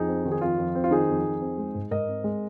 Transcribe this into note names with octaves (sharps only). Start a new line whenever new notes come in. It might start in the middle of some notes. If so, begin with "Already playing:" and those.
Already playing: F2 D#4 G#4
C4
D#3
G#4
F2 F4
F2
C4
F4
D#3 D#4 G#4
F2
F2
C4
G#3
G#2
G#2 A#4 D#5
C4
G#3